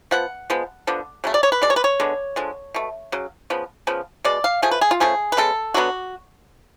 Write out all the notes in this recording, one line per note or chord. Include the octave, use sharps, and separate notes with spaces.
F3 B3 F#5
F3 G#3 B3
D3 F3 B3
C#3 F#3 A3
D5
C#5
B4
B2 G#3 D5
C#5
B4
C#5
D3 G#3 B3
D3 F3 G#3
B2 A3
C#3 F#3
C#3 F3 B3
C#3 F3 B3
B2 G#3 D5
F5
F3 A3 G#4
B4
G#4
F4
C#3 F3 A3 G#4
B4
C#3 G#3 B3 A4
D3 F#3 B3 F#4